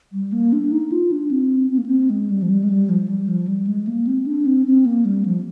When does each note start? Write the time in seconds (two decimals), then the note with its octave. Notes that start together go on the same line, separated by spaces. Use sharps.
0.13 G3
0.32 A#3
0.53 D4
0.72 D#4
0.92 F4
1.12 D4
1.31 C4
1.71 C4
1.78 A#3
1.86 C4
2.10 G#3
2.30 G3
2.42 F3
2.50 G3
2.64 G#3
2.70 G3
2.89 F3
3.08 G3
3.28 F3
3.48 G3
3.67 G#3
3.87 A#3
4.07 C4
4.26 D4
4.46 C4
4.66 C4
4.86 A#3
5.05 G3
5.26 F3